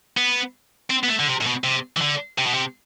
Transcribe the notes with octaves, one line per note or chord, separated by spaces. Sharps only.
B3
C4
B3
A3
D3
C3
A2
B2
C3
E3
D3
C3
B2
C3